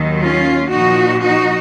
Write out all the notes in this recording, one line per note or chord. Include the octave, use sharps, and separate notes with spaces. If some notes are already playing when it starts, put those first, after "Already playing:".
Already playing: D#2 D#3 F#3
C#4 F4
A#2 F3 D#4 F#4
D#4 F#4